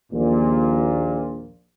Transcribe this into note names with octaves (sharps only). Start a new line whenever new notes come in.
A#1 D#2 A#2